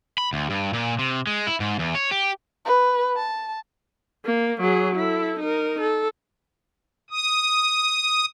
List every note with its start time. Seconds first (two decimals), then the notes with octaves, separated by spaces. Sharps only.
0.18 B5
0.33 D2
0.50 G2
0.73 A#2
0.99 C3
1.27 G#3
1.47 E4
1.60 G#2
1.79 E2
1.95 C#5
2.11 G4
2.65 B4
3.16 A5
4.25 A#3
4.61 F#3 G#4
4.96 E4 A4
5.40 D#4 A#4
5.81 A4
7.10 D#6